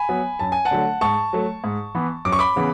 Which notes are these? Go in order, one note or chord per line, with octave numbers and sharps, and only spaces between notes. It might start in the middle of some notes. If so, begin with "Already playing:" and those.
Already playing: G#5 B5
F#3 B3
F#2 A5
G#5
F#5 A5
D3 F#3 A3
G#2 A5 C#6
F#3 A3
G#2
E3 B3
F#2 D6
C#6
B5 D6
C#3 E3 B3